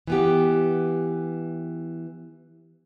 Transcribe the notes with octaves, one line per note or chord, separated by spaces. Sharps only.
E3 B3 G4